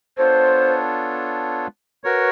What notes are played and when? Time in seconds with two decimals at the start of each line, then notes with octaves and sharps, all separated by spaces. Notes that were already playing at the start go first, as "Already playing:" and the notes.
0.18 B3 D4 F4 A4 C5 C#5
2.04 F#4 A#4 B4 C#5